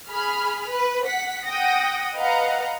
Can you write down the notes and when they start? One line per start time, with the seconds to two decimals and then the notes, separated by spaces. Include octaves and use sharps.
0.11 G#4 B5 F6
0.70 B4
1.07 F#5 B6
1.47 F#5 G5 D#6 A#6
2.17 B4 D#5 F5 F#5 A#5